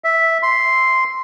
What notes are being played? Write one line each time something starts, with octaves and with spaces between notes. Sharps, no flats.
E5
C6